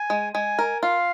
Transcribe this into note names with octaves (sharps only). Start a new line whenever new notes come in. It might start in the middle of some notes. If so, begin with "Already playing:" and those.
Already playing: G#5
G#3
G#3 G#5
A#4
F4 F5